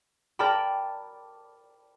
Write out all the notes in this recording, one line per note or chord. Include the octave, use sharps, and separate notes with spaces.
A#4 D5 G5 A5 B5